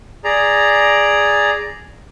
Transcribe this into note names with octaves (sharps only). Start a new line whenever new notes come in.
G#4 D5 A#5